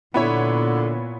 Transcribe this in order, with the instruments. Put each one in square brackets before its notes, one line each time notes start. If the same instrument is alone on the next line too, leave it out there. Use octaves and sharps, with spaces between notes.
[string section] A#2 [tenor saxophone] D3 [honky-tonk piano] B3 E4 C#5